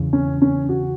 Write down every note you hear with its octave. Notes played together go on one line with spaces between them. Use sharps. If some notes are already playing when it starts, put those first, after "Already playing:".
Already playing: E2 C#3 E3
C#4
C#4
F#4